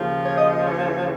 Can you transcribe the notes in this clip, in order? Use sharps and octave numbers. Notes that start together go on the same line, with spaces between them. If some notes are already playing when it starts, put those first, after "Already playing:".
Already playing: D#2 C#3 F3
C#5
D#5
D#5
C#5